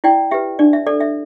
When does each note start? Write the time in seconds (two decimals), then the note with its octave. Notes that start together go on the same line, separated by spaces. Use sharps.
0.04 E4 D5 G5
0.31 G4 B4 E5
0.59 D4 D5
0.73 E5
0.87 A4 D5
1.01 E5